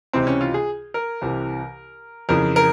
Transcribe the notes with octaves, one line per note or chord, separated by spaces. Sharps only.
C#2 C3 E3 C4
C#4
F4
G#4
A#4
C2 C3 E3
F2 C#3 E3 A#4
A#4